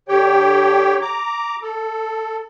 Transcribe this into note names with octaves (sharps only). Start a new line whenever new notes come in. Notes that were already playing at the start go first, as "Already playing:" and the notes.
D3 G4 C#5 G5
A#5 D6
A4